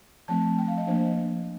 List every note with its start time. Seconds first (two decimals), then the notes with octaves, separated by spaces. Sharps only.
0.28 F3 A3 C4 A5
0.58 G5
0.68 F5
0.78 D#5
0.87 F3 A#3 D4 C5